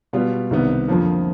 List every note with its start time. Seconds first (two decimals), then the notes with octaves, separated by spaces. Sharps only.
0.13 B2 G3 B3 F4
0.50 C2 C3 D#3 G3 B3
0.88 F2 D3 F3 A#3